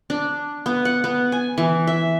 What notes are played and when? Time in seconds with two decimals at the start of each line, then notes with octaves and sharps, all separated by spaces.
0.10 D4
0.66 B3
0.85 F#5
1.04 B3
1.32 G#5
1.58 E3
1.87 E5